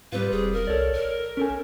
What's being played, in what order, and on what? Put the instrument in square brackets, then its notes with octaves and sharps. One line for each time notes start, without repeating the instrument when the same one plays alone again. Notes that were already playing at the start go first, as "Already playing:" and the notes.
[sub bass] G#2 [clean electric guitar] G3 C4 F4 [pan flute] B4
[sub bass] E1 [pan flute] G#4
[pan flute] A#4
[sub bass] C2 [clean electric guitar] A4 C#5 D5
[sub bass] A#1 [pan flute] A#4
[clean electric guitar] C#4 A4 G#5